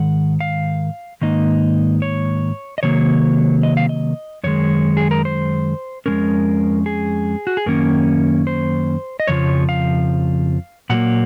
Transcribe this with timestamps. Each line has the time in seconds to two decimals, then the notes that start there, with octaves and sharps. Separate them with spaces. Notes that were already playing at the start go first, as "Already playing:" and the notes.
Already playing: G#2 D#3 F#5
0.40 F5
1.21 G#2 D#3 A#3 D#4 D#5
2.02 C#5
2.78 D#5
2.83 C3 D#3 F#3 A#3 C#5
3.63 D#5
3.77 F5
3.89 D#5
4.44 F#2 D#3 G#3 C#5
4.97 G#4
5.11 A#4
5.25 C5
6.06 F2 D#3 G#3 C#4 A#4
6.86 G#4
7.47 F#4
7.57 G#4
7.66 F#2 D#3 A#3 C#4 A#4
8.47 C5
9.20 D#5
9.27 F2 C#3 F3 C#5
9.69 F5
10.90 A#2 F#3 A#3 F#5